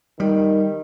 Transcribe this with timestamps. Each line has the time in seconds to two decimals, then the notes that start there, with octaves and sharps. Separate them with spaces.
0.20 D#3 G3